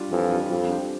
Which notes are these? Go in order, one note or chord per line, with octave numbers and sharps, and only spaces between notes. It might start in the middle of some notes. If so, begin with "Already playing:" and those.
Already playing: G3 D4 F4
F2 E3
G3 D4 F4
F2 G3
D4 G4 C5